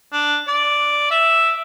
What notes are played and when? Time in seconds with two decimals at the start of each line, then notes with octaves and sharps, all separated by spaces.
0.12 D4
0.48 D5
1.11 E5